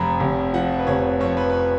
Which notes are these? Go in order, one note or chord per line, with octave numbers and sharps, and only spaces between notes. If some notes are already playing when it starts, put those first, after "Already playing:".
Already playing: F1 F2 F3 A#5 B5
F1
F3 F#5
B4
F1 C#5
F2 C#5
B4
B4
C#5